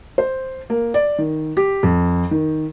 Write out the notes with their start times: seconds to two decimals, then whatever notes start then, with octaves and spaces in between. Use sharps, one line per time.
0.18 C5
0.70 A#3
0.94 D5
1.18 D#3
1.57 G4
1.83 F2
2.31 D#3